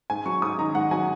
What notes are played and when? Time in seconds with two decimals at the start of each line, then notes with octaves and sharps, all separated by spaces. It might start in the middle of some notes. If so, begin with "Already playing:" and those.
0.10 G#2 G#5
0.26 F#3 C#6
0.42 G#2 D#6
0.58 D#3 A#5
0.74 G#2 F#5
0.91 F#3 G#5